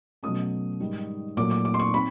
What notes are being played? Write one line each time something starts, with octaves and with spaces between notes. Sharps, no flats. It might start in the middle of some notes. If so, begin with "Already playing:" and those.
B2 F#3 A3 C#4 D#6
G#2 D#3 G3
A#2 F#3 A3 D6
D6
D6
C6
C#6
C4 B5